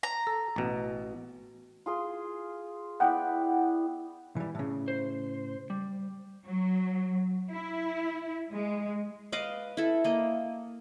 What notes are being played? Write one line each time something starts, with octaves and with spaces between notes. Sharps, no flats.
A#5
A4
A1 B2
F4 G#4 C6
B3 E4 D5 F#5 G5
E3 G3
A2 C#3
C5
G3
F#3
E4
G#3
B4 D#5 F5 D6
E4 A4
A#3 D#5